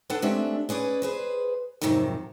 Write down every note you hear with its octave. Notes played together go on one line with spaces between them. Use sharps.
D4 A4 B4 F#5 A5
G#3 A3 C4 D4 G4 E5
C#4 G#4 B4 D5
G#4 B4 C5
F2 G#2 C3 D#3 F3 F#3